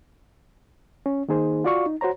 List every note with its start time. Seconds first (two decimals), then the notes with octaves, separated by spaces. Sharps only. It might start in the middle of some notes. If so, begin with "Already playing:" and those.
1.06 C#4
1.29 D#3 A#3 D#4 G#4 C5
1.64 F4 F#4 D5 F5 C#6
1.86 D#4
2.01 F#4 C5 C#5 A#5